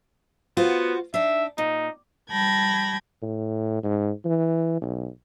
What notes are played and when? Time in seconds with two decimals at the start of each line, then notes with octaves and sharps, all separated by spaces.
0.57 B3 F4 F#4 C5
1.14 D4 D#4 E5
1.58 A#2 D#4
2.31 G3 G5 A5 B5 G#6 A#6
3.22 A2
3.83 G#2
4.25 E3
4.82 B1